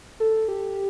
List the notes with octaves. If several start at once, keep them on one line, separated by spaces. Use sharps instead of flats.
A4
G4